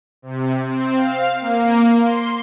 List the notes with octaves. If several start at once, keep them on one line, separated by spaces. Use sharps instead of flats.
C3
C4
F5
A#3
C6